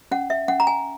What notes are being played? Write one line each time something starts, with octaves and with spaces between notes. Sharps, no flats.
C#4 F#5
E5
C#4 F#5
A#5
G#5